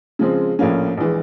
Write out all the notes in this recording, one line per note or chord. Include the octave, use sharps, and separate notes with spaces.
C#3 F3 G#3 C4
A#1 A2 F3 A#3 C#4
A#1 E3 G#3